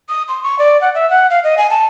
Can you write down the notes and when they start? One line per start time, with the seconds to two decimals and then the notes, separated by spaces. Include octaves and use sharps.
0.09 D#6
0.28 C6
0.43 C#6
0.59 D5
0.81 F#5
0.95 E5
1.10 F#5
1.30 F5
1.44 D#5
1.58 G#5
1.70 A5